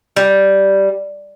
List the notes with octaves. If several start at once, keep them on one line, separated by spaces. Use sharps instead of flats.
G3